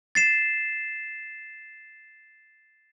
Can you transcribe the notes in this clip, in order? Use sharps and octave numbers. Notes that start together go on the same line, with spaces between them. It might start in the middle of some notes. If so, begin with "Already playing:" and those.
A6 C7 E7